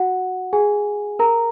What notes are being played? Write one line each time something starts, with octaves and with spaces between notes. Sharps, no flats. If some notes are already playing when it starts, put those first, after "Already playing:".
Already playing: F#4 F#5
G#4 G#5
A#4 A#5